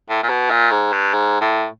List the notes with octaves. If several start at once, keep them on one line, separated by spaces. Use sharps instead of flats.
A2
A#2
B2
A#2
G#2
G2
G#2
A2